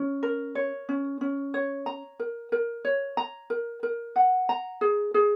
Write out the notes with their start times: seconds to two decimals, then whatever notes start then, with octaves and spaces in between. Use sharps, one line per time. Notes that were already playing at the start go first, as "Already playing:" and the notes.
Already playing: C#4
0.23 A#4
0.55 C#5
0.89 C#4
1.21 C#4
1.54 C#5
1.86 A#5
2.20 A#4
2.52 A#4
2.85 C#5
3.17 A#5
3.50 A#4
3.83 A#4
4.16 F#5
4.49 A#5
4.81 G#4
5.14 G#4